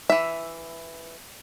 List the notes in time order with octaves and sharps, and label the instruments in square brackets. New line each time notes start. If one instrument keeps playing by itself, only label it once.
[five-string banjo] E3 E5